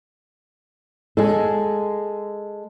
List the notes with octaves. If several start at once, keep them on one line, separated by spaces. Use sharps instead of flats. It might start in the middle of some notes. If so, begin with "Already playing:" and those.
G#3 A4